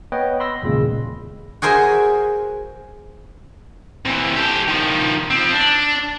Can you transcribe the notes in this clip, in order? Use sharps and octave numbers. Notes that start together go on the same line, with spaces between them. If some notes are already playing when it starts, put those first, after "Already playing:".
B3 B4 C#5 D#5 G5
B5 C6 E6 A#6
G#1 E2 A#2 C#3 G#3
F#4 G#4 A#4 C5 E5 G#5
C3 E3
G4 A4
D#3 F3
F3 C4
D4